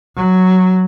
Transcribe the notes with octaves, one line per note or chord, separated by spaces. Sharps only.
F#3